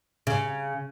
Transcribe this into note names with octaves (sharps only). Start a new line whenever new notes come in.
C#3